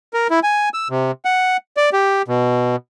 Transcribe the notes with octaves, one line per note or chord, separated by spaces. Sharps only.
A#4
E4
G#5
E6
C3
F#5
D5
G4
B2